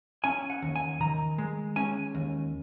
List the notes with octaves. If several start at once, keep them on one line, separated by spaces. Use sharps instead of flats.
C#4 G#5
F#5
D#2
G#5
D#3 A#5
G#3
C#4 G#5
D#2